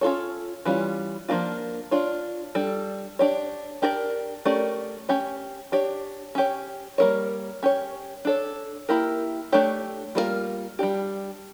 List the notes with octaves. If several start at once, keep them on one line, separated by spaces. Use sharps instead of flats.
C#4 F4 A4 C#5
E3 G3 C#4 F4
F3 A#3 D4 F4
D4 F4 C#5
G3 D4 A4
D4 G4 C#5
D4 G4 A#4 D5
A3 C#4 G4 A#4 D5
C#4 G4 C#5
D4 G4 C#5
C#4 G4 C#5
G3 A#3 E4 A#4 C#5
C#4 G4 C#5
D4 A4 C#5
A#3 E4 G4 A#4
A3 D4 G4 C#5
G3 A#3 D4 F4 A#4
G3 D4 G4